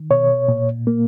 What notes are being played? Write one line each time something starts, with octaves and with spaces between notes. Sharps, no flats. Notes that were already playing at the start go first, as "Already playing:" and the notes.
Already playing: D#3
B2 C#5
A#2
A#3